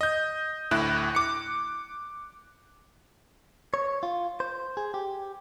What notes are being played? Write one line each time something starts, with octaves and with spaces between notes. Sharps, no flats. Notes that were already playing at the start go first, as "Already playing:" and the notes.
D#5 G6
D2 A2 E4 F#6
D6 C#7
C#5
F4
C5
G#4
G4